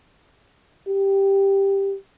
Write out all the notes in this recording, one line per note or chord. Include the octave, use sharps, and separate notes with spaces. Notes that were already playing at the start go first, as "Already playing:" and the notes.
G4